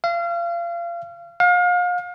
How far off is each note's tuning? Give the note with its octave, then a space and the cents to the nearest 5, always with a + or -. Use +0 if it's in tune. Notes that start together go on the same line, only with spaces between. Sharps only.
F5 -30
F5 +35